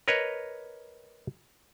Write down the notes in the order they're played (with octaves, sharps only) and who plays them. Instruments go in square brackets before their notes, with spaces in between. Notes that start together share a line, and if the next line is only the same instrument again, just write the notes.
[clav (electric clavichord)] A#4 B4 C#5 D#5